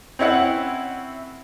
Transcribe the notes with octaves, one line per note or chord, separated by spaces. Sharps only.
C4 C#4 E4 F#5